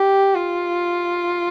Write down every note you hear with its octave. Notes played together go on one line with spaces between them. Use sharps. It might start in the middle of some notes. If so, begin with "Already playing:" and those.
Already playing: G4
F4